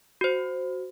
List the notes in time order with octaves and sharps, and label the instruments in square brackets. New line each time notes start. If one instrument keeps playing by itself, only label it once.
[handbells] F#4 C5